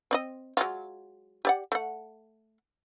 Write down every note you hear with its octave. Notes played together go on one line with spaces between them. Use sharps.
C4 D5 D#5
F#3 G#3 F4
G4 D5 F#5
A3 F#5